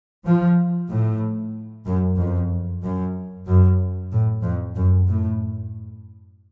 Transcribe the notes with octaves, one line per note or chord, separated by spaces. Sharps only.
F3
A2
F#2
F2
F#2
F#2
A2
F2
F#2
A2